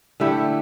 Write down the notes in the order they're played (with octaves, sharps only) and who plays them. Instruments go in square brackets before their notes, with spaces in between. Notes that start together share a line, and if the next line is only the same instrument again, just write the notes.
[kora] D3 A3 E4 G4